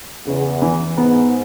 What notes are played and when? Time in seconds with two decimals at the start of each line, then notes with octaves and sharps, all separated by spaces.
0.26 E2 C#3
0.62 E3
0.97 G#2 B3